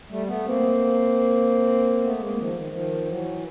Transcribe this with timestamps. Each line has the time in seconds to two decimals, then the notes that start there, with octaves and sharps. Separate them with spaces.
0.10 G3 A3
0.27 A3 B3
0.45 A#3 C4
2.02 A3 B3
2.20 G#3 A#3
2.37 D#3 F3
2.54 D#3
2.71 D#3 F3
3.07 E3 F#3